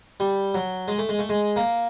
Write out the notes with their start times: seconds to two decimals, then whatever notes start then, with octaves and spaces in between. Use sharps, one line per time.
0.20 G3
0.54 F#3
0.88 G#3
0.99 A3
1.09 G#3
1.19 A3
1.29 G#3
1.56 A#3